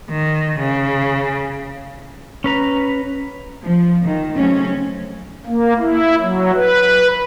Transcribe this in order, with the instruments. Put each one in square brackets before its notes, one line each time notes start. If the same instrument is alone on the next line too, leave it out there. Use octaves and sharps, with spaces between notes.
[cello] D#3
C#3
[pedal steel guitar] C#4 B4 A#5
[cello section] F3
D#3
C#3 F#3 A3 C4 C#4
[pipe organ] A#3
E4
F#3
B4